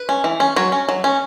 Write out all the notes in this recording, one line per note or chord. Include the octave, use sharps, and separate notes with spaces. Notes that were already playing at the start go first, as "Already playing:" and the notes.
Already playing: B4
C#4
E3
C#4
F#3 C#5
C#4
F#3
C#4